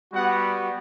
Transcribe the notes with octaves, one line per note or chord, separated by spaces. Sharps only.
G3 B3 F#4 F#5